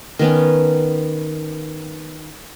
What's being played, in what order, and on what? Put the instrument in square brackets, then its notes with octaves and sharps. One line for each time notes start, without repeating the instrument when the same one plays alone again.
[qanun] D#3 B3 C#4